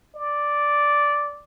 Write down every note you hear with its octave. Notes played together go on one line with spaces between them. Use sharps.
D5